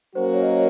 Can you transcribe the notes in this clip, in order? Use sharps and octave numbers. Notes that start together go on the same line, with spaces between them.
F#3 A#3 C#4 F#4 A#4 C5
C#5
D#5
C#5